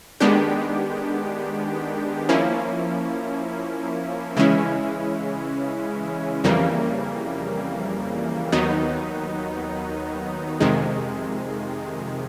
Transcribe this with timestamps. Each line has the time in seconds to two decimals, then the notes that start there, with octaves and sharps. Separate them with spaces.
0.20 D#3 G#3 B3 D4 G4
2.29 F3 A#3 C#4 E4
4.36 C#3 E3 G#3 C#4 E4
6.44 F2 C#3 E3 G3 A#3
8.52 D#2 D#3 F#3 B3 D#4
10.60 F2 C3 D#3 G#3